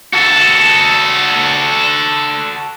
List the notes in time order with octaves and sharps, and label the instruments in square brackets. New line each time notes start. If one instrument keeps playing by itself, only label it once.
[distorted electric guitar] F#4 A4